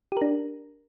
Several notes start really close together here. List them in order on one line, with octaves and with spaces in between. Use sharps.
G4 A#4 D4